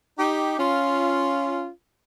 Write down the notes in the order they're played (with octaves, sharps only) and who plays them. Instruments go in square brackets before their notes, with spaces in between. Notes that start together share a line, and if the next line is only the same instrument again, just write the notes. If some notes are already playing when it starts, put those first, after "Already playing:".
[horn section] D#4 G4
C#4 F4